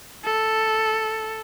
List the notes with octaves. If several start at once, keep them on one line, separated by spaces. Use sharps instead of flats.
A4